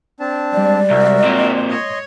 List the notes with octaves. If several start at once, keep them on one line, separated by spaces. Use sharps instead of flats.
C4 D4 A5
G3 G#3 D5
C2 F#4 A#4 E5
A#2 C4
C#5 D#5 C6